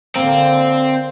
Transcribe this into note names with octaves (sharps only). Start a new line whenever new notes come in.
D3 A#3 C4